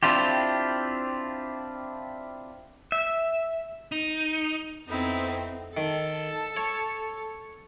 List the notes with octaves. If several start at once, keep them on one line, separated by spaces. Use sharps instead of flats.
C4 D4 E4 F4 G4
E5
D#4
F2 B3 C4 D#4 E4
D#3 A4
C#5